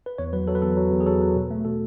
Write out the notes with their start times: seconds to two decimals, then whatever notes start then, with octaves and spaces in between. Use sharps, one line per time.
0.06 B4
0.18 E2 C#5
0.33 F#3 B4
0.48 F#3 A4
0.55 B4
0.62 E2 A4
0.77 F#3
0.92 E2
1.00 G#4
1.06 F#3 A4
1.21 F#3
1.36 B2
1.51 A3
1.65 B2 A4